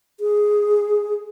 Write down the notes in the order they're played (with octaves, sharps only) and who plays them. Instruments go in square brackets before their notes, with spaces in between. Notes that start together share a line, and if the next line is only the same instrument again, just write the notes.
[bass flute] G#4